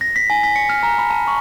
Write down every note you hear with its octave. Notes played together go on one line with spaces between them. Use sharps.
A#6
B6
G#5
B6
C#7
F6
A#5
B5
A5
C#6